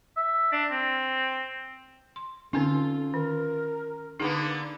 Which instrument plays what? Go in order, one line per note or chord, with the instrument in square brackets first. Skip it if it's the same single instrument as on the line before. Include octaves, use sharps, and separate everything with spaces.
[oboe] E5
D4
C4
[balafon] C6
[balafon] D3 C4 D#4 [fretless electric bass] C#4 [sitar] F4 [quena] A4
[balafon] D#3 [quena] A#4
[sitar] D3 A#3 B3 [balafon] D#4 G#4